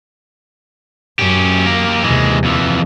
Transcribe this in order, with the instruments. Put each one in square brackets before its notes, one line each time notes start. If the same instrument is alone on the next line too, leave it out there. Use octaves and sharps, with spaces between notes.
[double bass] F#2 [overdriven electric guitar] C#4 G4
[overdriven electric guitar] A#3 G4
[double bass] D#2 C3 [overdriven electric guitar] E3 G#3
[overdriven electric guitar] F2 E3